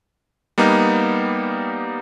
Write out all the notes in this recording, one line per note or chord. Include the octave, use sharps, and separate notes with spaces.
G3 A#3 B3 D#4